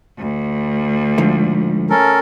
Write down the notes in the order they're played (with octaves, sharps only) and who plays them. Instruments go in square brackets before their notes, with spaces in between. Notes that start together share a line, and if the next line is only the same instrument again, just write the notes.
[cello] D2
[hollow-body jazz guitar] G#2 D3 F3
[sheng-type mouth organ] C#4 A4 A#4